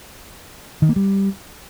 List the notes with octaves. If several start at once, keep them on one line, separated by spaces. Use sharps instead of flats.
D#3
A#3
G3